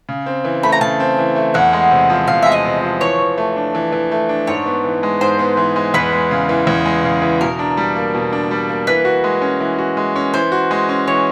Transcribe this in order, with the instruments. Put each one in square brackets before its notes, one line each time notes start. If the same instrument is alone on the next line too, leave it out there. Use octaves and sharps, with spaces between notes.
[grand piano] C#3
C4
E3
[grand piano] A3 [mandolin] B5
[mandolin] A#5
[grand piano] C#3 [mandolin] A5
[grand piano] C4
E3
A3
[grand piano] E2 [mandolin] F#5
[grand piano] G#3
C3
F3
[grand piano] E2 [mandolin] F5
[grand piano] G#3 [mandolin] E5
[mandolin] D#5
[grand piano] C3
F3
[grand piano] E3 [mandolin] C#5
[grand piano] E3
A3
D4
E3
E3
A3
D4
[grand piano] G#2 [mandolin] C#5
[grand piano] B3
E3
G#3
[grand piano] G#2 [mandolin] C5
[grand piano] B3
E3
G#3
[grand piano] E2 [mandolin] B4
[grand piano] G#3
C#3
E3
E2
G#3
C#3
E3
[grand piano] B2 [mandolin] A#4
[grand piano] D4
G3
A#3
B2
D4
G3
A#3
[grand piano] E3 [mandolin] B4
[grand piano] F#4
G#3
C#4
E3
F#4
G#3
C#4
[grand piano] E3 [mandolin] C5
[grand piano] F#4
G#3
C#4
[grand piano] E3 [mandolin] C#5